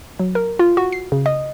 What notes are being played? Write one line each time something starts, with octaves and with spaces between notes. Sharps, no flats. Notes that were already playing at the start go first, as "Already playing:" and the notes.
F#3
A#4
F4
F#4
C7
C#3
D#5